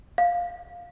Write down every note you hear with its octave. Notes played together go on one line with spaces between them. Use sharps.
F5